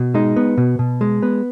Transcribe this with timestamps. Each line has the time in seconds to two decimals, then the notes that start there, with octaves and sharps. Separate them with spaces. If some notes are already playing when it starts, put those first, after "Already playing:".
Already playing: B2
0.14 G#3 D#4
0.36 B3
0.57 B2
0.79 B2
1.01 G#3
1.23 B3